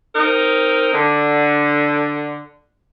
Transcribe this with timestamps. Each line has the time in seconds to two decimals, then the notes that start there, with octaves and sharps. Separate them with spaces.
0.15 C4 D#4 A#4
0.94 D3